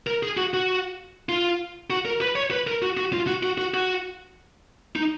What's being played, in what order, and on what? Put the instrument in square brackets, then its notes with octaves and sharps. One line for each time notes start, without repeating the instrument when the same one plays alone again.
[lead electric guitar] A#4
G#4
F#4
F#4
F4
F#4
A#4
B4
C#5
B4
A#4
F#4
F#4
F4
F#4
F#4
F#4
F#4
D#4